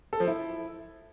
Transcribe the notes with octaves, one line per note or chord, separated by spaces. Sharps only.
A4
F3
E4